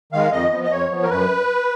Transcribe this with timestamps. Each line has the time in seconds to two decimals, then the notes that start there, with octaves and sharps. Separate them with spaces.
0.13 D#3 G#3 F5
0.32 F2 D#5
0.51 F3 B3
0.63 D#5
0.71 F2 C#5
0.91 F3 B3
1.03 A#4
1.10 F#2 B4